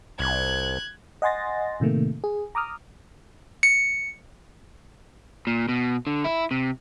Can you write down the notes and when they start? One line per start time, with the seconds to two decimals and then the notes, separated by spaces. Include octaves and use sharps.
0.19 C2 F#6 G#6
1.22 D#5 F#5 G#5 C6 A6 A#6
1.80 A2 C3 D#3 A3 A#3
2.24 G#4
2.55 A#5 D6 D#6 F6
3.63 C#7
5.47 A#2
5.69 B2
6.07 D3
6.24 E4
6.51 C3